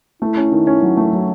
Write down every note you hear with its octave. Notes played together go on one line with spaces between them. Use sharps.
A3 E4
C#4
D#3
C#4
F#3
A3
F#3